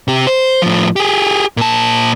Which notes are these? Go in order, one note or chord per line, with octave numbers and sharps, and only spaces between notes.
C3 G4
C5
A2 F3
G4 G#4
A#2 A5